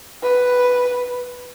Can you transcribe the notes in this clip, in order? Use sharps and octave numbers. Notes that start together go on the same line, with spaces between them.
B4